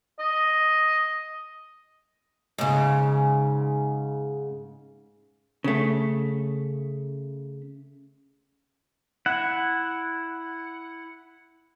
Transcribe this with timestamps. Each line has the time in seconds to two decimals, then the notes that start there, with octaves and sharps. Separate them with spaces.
0.20 D#5
2.58 G#2 C#3
5.64 C#3 A3
9.26 E4 F#5